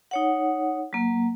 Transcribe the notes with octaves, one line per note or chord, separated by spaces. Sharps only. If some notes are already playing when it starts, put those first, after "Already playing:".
D#4 C#5 F#5
F#3 A#3